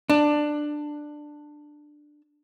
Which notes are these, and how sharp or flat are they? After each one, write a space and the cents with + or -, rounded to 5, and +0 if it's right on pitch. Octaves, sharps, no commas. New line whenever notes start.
D4 +15